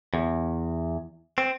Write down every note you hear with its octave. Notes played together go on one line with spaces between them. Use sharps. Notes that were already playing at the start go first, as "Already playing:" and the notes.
E2
C4